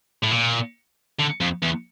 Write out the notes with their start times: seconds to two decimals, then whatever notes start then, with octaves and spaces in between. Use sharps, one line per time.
0.23 A2
0.32 A#2
1.19 D3
1.40 F2
1.62 E2